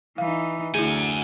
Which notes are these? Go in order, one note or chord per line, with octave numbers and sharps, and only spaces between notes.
E3 D#4 F5
D2 E4 G#4 F#5 G#5